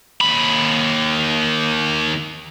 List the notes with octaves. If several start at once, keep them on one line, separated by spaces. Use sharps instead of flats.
D#2 B5